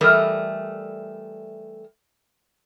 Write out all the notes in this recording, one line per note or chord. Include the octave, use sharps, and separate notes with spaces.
E3 G3 A3 A4 A#4 D#5